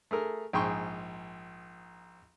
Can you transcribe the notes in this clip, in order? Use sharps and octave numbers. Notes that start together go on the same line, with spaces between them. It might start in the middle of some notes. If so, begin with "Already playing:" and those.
A3 G#4 A#4
A#1 G#2 G#4 G5 C6 C#6